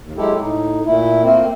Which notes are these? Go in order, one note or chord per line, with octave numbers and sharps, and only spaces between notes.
D#2
F#3 G#3 E4 G4 A4
A2 D#4
A#2 A3 E4
A3 A#3 C4